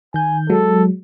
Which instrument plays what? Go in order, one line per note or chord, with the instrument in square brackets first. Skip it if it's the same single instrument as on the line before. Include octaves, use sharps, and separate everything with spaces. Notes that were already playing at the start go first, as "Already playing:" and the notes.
[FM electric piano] D#3 G6 [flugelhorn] G#5
[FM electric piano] F#3 G#3 [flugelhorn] A4